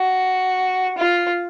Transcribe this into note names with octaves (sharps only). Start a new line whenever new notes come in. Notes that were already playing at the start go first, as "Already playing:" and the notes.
Already playing: F#4
F4